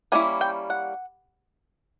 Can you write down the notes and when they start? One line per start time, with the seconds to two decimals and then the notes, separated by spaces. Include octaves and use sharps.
0.12 G3 A#3 C#4 E4 G#5
0.41 G5
0.70 F#5